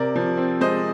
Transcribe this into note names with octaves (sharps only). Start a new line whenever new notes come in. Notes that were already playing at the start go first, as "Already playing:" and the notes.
Already playing: C3 A#4 D5
F3
C4
G#3 C5 D#5